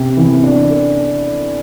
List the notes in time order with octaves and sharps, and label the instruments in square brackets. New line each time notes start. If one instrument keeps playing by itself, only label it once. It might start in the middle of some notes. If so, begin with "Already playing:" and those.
Already playing: [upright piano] C3
E3
D4
A4